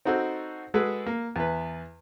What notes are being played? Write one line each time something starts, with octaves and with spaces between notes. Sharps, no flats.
C4 D#4 F#4 A4 C5
G#3 F#4 G#4 A4 B4
A#3
E2 B4